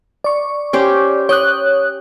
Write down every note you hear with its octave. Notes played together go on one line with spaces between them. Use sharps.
D5 C#6
C#4 G4 C5
C#5 G5 D#6 F#6